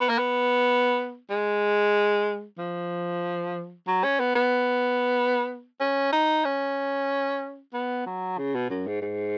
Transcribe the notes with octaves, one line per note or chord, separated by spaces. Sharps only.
B3
A#3
B3
G#3
F3
F#3
C#4
B3
B3
C#4
D#4
C#4
B3
F#3
C#3
B2
F#2
G#2
G#2